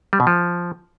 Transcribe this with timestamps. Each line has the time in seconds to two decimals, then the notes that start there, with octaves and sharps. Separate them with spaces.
0.13 G3
0.20 B2
0.27 F3